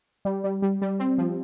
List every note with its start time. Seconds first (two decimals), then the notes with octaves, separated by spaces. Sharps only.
0.25 G3
0.44 G3
0.62 G3
0.82 G3
1.00 C4
1.18 F3